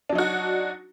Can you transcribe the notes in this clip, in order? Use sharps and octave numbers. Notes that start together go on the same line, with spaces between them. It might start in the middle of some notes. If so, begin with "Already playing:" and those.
F#3 D4 D#4 F#4